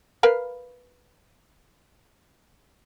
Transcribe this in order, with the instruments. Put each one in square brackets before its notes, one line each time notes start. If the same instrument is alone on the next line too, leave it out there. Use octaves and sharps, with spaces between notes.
[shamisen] A#4 B4 F5